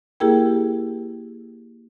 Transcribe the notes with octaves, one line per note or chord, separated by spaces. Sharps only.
A#3 E4 G4 G#4 A#4 G5